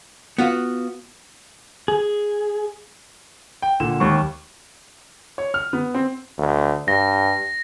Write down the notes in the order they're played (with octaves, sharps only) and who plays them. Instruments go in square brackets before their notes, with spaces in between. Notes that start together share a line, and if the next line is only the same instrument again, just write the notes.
[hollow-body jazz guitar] B3 F4 F#4
[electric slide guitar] G#4
[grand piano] G5
A#2 D3 E7
D#2 G3 C#6
C#5
F6
B3
C4
[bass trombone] D2
[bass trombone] G2 [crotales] A#6